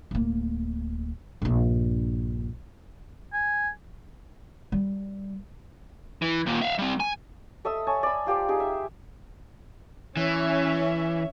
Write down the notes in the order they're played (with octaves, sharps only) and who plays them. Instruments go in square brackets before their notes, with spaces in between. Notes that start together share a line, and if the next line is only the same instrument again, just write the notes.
[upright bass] D1 A#3
A#1 G2
[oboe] G#5
[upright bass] G3
[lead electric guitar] E3
D#2 A#2
E5 F5
G3 C4
G#5
[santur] A4 D#5 E5 E6
C#5 G#5 A5
D5 B5
F4 G4 C5 D5
D#4 G4 G#4
E5
[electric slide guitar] E3 [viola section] C#4 E5